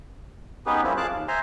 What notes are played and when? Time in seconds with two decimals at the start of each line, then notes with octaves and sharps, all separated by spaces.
0.66 B3 C#4 D#4 G4 G#4 B4
0.83 F3 G3 A#3 C4 C#4 E4
0.97 F2 G#4 F5 A5 D6 F#6
1.11 D#2
1.28 C5 E5 G#5 A#5 C6